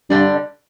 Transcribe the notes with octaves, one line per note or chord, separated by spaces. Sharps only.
G2 D3 G3 D4